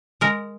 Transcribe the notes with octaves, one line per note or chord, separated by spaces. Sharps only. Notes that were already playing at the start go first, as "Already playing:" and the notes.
G#3 A#4